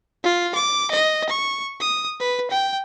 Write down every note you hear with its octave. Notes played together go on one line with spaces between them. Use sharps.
F4
D6
D#5
C#6
D#6
B4
G5